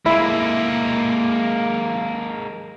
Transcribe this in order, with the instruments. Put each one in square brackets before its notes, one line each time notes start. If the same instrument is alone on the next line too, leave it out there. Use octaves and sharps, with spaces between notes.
[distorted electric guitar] G#3 A#3 [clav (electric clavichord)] E4